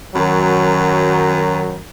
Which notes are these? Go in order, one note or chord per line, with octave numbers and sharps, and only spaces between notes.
F#2 D#3 F#3